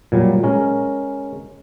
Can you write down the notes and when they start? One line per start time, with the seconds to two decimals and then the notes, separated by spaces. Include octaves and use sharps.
0.12 A#2 F#3 G3
0.43 G#3 C#4 A#4